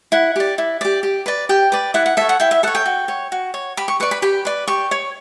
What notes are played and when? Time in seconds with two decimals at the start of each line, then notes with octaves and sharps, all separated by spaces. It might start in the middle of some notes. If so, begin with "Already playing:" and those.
0.12 E4 F#5
0.36 G4 D5
0.58 E4
0.81 G4 D5
1.03 G4
1.26 B4 D5
1.49 G4 G5
1.72 B4 D5
1.94 E4 F#5
2.06 F#5
2.17 A4 C#5 E5
2.29 F#5
2.40 E4 G5
2.51 E5
2.63 A4 C#5 F#5
2.75 G5
2.86 F#4
3.08 C#5
3.32 F#4
3.54 C#5
3.77 G4 B5
3.88 C#6
4.00 B4 D5 C#6
4.11 B5
4.22 G4 B5
4.45 B4 D5
4.67 G4 C#6
4.91 C#5